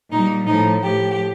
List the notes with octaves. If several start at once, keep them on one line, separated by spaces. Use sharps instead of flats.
A#2 G3 D#4
A2 F3 D#4
A2 F3 G4